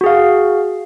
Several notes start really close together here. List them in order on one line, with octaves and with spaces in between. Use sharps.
F#4 G#4 F5